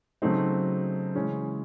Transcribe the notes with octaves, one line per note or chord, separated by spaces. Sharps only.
C#3 F#3 A3 C4 D#4
C#3 E3 G#3 C#4